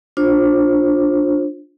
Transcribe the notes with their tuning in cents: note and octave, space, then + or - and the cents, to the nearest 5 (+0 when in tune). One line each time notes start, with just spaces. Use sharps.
D4 +0 F4 +15 C5 +25